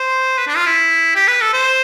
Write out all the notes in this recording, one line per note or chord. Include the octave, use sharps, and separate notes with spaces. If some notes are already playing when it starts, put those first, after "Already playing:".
Already playing: C5
B4
D4
F4
E4
G4
B4
A4
C5